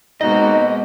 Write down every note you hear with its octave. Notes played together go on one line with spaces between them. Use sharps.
B2 G#3 A#3 C4 D#4 F#4 D#5